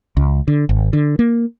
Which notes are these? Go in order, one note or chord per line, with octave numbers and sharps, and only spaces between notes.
C#2
D3
G#1
D3
A#3